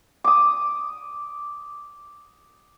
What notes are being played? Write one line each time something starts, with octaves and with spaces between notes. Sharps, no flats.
D6 D#6